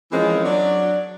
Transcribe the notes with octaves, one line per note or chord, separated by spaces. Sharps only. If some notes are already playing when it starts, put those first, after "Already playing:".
E3 F3 G#3 A#3 C4 C#4
F#3 D4 D5